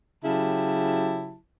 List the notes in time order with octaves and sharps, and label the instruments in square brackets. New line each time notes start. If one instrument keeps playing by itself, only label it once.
[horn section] C#3 F#3 E4 G4 A5